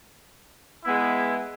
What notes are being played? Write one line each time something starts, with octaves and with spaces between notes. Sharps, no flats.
G#3 B3 E4